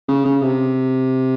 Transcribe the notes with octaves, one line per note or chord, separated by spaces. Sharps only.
C#3
C#3
C3